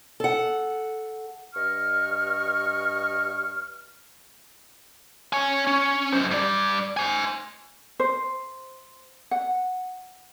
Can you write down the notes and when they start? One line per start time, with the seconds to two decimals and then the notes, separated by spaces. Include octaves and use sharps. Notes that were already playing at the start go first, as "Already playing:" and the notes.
0.20 A4 F#5
1.55 G2 D#5 C#6 F6
5.33 C#5 G#5
5.67 C#4
6.13 F#2 C5
6.31 G2 D5
6.97 C5 G#5
8.00 C5
9.31 F#5